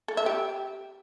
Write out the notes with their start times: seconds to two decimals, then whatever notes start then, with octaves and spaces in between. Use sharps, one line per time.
0.08 A4
0.17 E5
0.26 G4